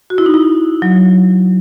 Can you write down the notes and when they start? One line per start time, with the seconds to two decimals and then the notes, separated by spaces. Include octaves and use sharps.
0.10 F#4
0.18 E4
0.26 D#4
0.34 E4
0.82 F#3